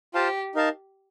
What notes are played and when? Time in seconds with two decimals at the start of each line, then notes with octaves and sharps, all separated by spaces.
0.14 F4 G4 C5 F5 A5
0.55 D#4 A#4 F5 A5